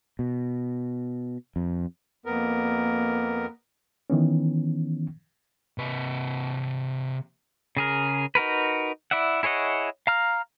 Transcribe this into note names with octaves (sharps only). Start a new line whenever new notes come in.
B2
F2
F2 A#3 B3 A#4
D#3 E3 B3 C#4
C3 B4
C#3 G#4 A#4
D#4 F#4 A#4 B4
E4 D5 E5 F#5
E4 G#4 C#5 D#5 F#5
F5 A#5 F6